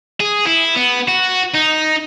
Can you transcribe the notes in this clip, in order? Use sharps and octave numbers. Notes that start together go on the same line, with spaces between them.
G#4
E4
B3
F#4
D#4